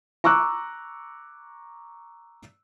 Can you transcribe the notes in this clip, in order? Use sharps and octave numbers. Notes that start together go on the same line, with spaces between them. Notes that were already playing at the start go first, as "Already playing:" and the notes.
A#5 C#6 D6 E6 F#6